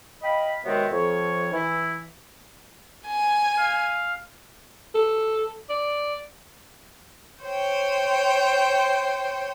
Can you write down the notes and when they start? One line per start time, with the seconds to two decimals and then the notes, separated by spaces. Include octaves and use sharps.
0.22 D#5 F5 G5 B5
0.65 C3 D#3 F#3 G#3 B3 C4
0.91 F2 F3 C#5
1.52 E3 E4
3.08 G#5
3.58 F5
4.95 A4
5.70 D5
7.43 C5 C#5 G5